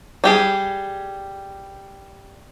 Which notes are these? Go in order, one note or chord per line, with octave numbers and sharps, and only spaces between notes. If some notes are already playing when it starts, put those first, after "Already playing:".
G3 G4 G#4